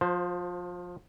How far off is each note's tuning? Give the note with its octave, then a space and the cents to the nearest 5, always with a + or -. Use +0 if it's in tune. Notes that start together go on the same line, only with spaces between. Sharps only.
F3 +25 C5 +0